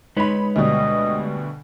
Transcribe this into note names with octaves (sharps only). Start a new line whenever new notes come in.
G#3 D#4 B4 C#5 B5
D2 B2 G3 D#5